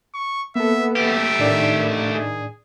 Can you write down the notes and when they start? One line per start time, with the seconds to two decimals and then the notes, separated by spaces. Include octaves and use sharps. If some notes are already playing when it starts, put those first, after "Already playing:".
0.14 C#6
0.56 A#3 B3 A4 E5
0.96 A3 G4 E5
1.39 A2 D#3 D4 D5
2.13 G#4